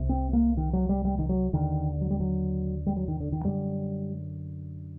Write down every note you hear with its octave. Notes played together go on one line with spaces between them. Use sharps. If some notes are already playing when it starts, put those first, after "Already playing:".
Already playing: C2 C3
C4
A#3
D#3
F#3
G3
G3
D#3
F#3
D#2 D3 D#3
F#3
G3
F#3
G3
F#3
D#3
D3
D#3
F#2 D3 G3